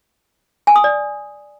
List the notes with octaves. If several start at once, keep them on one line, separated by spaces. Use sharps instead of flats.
G#5
D#6
D5